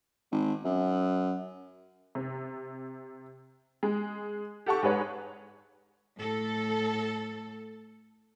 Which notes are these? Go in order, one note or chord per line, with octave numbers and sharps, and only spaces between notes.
G#1
F#2
C3
G#3
G4 A4 F#5 A5 C#6
G#2 G#4 B4 C#5
A2 A4